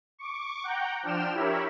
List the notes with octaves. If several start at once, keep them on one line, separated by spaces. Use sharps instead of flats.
C#6 D6
F#5 G5 A#5 G6
F3 D4 G5 F6 E7
E4 G4 A#4 C#5 E5 B5